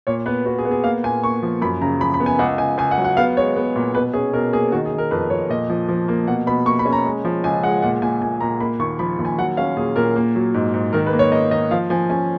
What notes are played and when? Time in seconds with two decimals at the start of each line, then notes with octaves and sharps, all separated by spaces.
0.07 A#2 C#5
0.26 B3 B4
0.46 B3 F#4
0.59 G#4
0.65 B3
0.71 G#4
0.84 A#3 F5
1.03 A#2 G#5
1.23 A#3 C#6
1.43 F3
1.61 F#2 B5
1.81 C#3 A#5
2.00 F3 B5
2.14 B5
2.20 B3
2.26 G#5
2.39 C#2 F#5
2.58 C#2 G#5
2.78 C#2 G#5
2.91 F#5
2.98 F#3
3.05 F#5
3.17 B3 F5
3.37 G#3 C#5
3.56 B3
3.76 A#2
3.94 B2 B4
4.13 C#4 G#4
4.33 B2 A#4
4.53 A#3 G#4
4.72 D#3 F#4
4.86 G#4
4.92 D#3
4.98 A#4
5.11 F2 B4
5.30 F2 C#5
5.49 A#2 D#5
5.70 F3
5.88 F3
6.08 A#3
6.27 B2 F#5
6.47 B2 B5
6.66 A#3 C#6
6.79 B5
6.86 C#4
6.93 A#5
7.06 G#3
7.25 F3
7.44 C#2 G#5
7.63 G#3 F#5
7.82 A#2 F#5
8.02 A#2 G#5
8.21 A#2 G#5
8.41 A#2 A#5
8.60 A#3 B5
8.79 D#2 C#6
8.99 F3 B5
9.18 D#2
9.25 G#5
9.38 F#3 F#5
9.57 C#4 F5
9.77 A#2 G#4
9.96 A#2 A#4
10.16 A#3
10.36 F#3
10.54 G#2
10.74 G#2
10.93 D#3 A#4
11.06 B4
11.13 A#3
11.19 C#5
11.32 A#3 D#5
11.51 D#3 D#5
11.71 F3 F5
11.90 F3 G#5
12.10 C#4 G#5